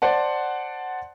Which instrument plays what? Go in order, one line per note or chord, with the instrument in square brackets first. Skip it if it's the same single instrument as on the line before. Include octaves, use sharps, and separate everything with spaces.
[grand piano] C5 D5 F#5 A5